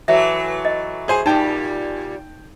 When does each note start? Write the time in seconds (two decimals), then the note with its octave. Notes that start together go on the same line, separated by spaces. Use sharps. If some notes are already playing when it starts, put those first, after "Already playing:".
0.08 E3 F#3 A3 E5
0.65 D#5
1.08 G#4 C5 G#5
1.26 A#2 G3 D#4 G5 A5